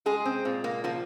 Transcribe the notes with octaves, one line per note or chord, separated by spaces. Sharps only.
G#3 G#4
C4
A#2
A#3
F3 A#3